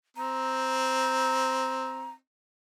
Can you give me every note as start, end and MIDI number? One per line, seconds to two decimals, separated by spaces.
0.17 2.16 60
0.17 2.10 82